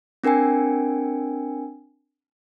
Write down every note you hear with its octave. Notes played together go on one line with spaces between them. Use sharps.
C4 D4 A#4 G5 G#5